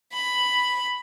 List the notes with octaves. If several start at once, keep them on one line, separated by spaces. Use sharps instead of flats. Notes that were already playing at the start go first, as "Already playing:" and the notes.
B5